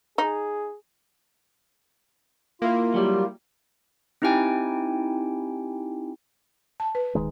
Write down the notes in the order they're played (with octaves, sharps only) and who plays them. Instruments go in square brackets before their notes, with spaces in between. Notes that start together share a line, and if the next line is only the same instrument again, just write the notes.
[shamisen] D#4 [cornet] G#4
[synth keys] A#3 E4 A#4 [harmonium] F4
[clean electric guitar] F#3 G3
[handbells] C4 D#4 E4 G4 G5 G#5
[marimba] A5
B4
[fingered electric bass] D1 D#3 G#3